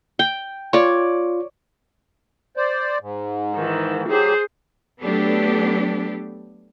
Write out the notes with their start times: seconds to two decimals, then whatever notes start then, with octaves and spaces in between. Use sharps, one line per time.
0.19 G5
0.73 F4 C#5 D5
2.57 C5 D5
3.01 G#2
3.54 D#3 E3
4.08 F#3 G4 G#4 C5
5.01 F#3 A3 B3 D4 G4 A4